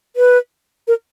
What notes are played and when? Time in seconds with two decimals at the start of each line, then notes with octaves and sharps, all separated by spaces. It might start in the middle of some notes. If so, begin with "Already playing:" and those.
0.16 B4
0.88 A#4